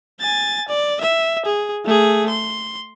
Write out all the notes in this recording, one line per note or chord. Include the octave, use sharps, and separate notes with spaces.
G#5 A6
D5
E5
G#4
A3 G#4
C6